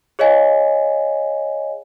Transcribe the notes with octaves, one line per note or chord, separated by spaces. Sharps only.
G#4 C#5 D#5 F5 G#5